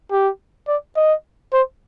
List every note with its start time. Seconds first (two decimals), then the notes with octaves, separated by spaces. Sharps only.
0.12 G4
0.68 D5
0.96 D#5
1.53 C5